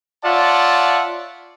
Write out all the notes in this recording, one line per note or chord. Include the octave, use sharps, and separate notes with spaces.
F4 C#5 D5 E5 F#5 A5